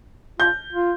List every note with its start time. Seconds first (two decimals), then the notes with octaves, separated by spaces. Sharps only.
0.39 F4 G6
0.73 F4